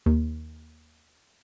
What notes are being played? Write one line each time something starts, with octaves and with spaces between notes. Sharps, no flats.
D#2